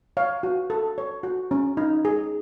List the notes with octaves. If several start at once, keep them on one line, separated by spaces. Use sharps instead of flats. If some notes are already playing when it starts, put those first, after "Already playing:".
C#5 F5
F#4
A4
C#5
F#4
C#4
D#4
G#4